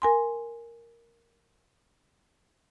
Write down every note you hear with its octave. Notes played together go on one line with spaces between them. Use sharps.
A#4 G#5 C6